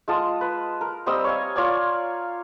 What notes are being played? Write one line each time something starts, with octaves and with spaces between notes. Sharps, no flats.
G#3 F4 A5 D#6
B4
A#4
G3 C4 D#5 E6
C#5 F5 G#5
F4 C#5 D5 G#5